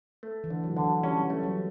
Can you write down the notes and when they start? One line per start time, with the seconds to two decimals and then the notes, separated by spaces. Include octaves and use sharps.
0.23 A3
0.44 E3
0.50 D3
0.64 F#3
0.77 D3 E3
0.84 F#3
1.03 G3 C#4
1.30 A3
1.43 F#3